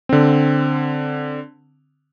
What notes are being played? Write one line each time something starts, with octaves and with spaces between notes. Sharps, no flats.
D3 C4